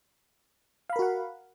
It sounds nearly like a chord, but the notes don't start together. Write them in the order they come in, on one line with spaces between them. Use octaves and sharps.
F5 B5 A#4 F#4 F#5